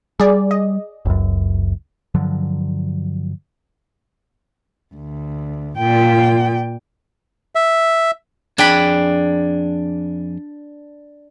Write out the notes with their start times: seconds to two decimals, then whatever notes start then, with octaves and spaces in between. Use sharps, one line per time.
0.20 G3 G#4 D5
0.51 D#5
1.05 F#1 C#2 F#2
2.14 G2 D3 F3 F#3
4.95 D2
5.78 A#2 G5
7.55 E5
8.58 F2 D4 G#4 G5 B5